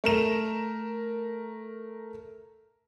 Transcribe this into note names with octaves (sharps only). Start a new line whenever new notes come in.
A3 A#4 E7